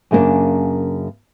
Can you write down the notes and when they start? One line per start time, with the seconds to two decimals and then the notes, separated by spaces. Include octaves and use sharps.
0.11 F#2 C#3 A#3 C4 D4